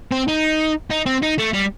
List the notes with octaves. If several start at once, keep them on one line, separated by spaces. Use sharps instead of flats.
C4
D#4
D#4
C4
D#4
A3
G3